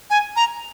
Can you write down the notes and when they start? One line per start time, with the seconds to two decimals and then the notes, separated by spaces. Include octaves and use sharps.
0.10 G#5
0.36 A#5